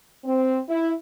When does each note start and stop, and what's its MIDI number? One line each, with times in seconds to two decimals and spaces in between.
0.24 0.58 60
0.68 0.91 64